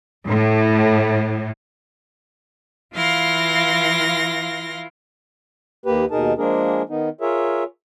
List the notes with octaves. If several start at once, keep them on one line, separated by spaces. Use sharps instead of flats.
A2
E3 E4 F4 F5 C6 A#6
D#2 A#3 G4 B4
D#2 B2 D#4 G#4 A#4 A5
F3 G#3 A#3 D4 G#4 A#4
D#3 B3 D#4
F4 G#4 A#4 C#5 E5